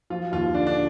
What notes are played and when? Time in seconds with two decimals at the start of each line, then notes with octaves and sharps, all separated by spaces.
0.10 F3 F4
0.32 D#2 F4
0.54 D3 D4
0.67 D4